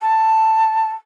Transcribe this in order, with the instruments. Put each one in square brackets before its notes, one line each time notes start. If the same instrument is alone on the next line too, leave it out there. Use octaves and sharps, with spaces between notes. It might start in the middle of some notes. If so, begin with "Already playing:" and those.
[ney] A5